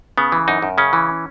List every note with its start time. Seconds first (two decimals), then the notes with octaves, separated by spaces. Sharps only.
0.18 C#3 B3
0.32 E3
0.48 F#2 D#4
0.62 F#2
0.78 C#3 C#4
0.93 E3